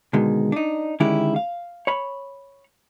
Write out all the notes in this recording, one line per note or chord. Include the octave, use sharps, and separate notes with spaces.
B2 D3 D#3 G#3
D4 D#4
D3 D#3 G#3 C#4 E4 G4
F5
C#5 B5